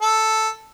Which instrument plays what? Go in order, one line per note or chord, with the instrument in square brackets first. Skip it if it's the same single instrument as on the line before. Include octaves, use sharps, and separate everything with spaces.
[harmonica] A4